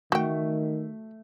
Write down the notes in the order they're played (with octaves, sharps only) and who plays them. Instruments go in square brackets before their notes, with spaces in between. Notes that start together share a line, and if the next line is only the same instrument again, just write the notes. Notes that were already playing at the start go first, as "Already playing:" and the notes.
[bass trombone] D#3 [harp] A3 [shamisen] F#4 G5